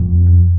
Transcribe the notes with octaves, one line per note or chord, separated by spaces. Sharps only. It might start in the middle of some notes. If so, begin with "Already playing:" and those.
Already playing: F2